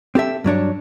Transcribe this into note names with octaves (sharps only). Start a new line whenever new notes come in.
C4 G4 A4 E5
G2 F#3 D4 C#5